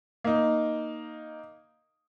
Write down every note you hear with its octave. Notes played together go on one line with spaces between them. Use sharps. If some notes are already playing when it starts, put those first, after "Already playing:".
A#3 D#4